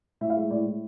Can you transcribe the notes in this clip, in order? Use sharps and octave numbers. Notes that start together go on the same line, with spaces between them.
A2 E5
F5
G#3 E5
A2 D5
A2